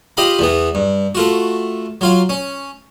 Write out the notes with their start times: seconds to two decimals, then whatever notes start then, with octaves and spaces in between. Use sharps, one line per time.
0.17 F4 G4 D#5 F5 B5
0.39 E2 E3 B3
0.75 G2
1.15 A3 F4 F#4
2.01 F#3 F4 F5
2.29 C#4